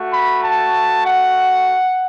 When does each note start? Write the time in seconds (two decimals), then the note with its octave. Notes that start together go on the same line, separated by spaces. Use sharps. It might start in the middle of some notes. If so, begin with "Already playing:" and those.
Already playing: A3 F#4
0.12 B5
0.43 A5
1.04 F#5